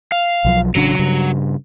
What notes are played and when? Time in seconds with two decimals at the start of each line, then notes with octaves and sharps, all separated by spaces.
0.12 F5
0.45 B1 F3 F#3
0.75 A1 C#3 F#3 D4
0.99 G2 C#3